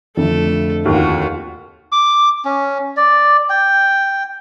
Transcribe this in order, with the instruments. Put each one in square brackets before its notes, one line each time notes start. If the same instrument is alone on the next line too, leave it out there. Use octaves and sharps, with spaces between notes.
[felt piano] F2 D3 [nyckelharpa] A3 A4
[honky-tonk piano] D#2 [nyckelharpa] F4 F#4
[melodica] D6
C#4
D5
G5